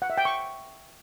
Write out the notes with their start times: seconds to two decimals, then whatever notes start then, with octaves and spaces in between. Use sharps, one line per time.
0.02 F#5
0.10 E5
0.18 G5
0.25 C#6